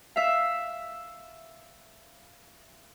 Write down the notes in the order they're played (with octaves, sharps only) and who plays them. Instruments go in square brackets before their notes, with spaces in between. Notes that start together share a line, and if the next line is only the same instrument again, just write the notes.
[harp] E5 F5